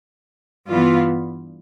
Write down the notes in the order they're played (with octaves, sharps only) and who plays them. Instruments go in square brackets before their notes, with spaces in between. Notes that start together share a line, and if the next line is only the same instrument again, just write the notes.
[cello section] G2 E3 B3 F4